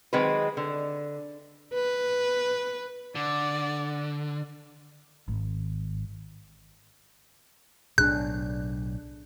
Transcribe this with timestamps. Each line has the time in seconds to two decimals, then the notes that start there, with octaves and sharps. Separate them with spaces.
0.13 D#3 F#3 G#3 C4 G#4 B4
0.57 D3
1.74 B4
3.15 D3 D5
5.28 G#1
7.98 B1 A2 D4 G#4 F#6